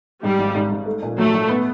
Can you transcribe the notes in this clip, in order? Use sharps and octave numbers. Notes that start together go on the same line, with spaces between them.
G#2 G3
G#1
G#2
G#2
A3
A#2
F#3 A3
F#3
B3